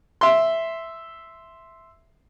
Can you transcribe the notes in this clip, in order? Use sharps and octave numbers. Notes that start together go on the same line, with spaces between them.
E5 C6